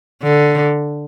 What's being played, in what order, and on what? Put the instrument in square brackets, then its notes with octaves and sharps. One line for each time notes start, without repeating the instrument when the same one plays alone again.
[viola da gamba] D3